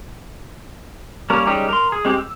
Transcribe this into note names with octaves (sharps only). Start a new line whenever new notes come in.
G3 A#3 C#4 A#4 C#5
G3 G#3 C#4 D#4 G4
A#4 C6
G#4
G#3 C4 G4
E6